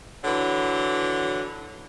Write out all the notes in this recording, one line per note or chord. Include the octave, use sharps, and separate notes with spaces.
D3 E3 F#3